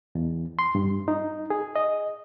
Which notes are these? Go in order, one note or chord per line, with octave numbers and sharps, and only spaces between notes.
E2
C6
G2
D#4
G#4
D#5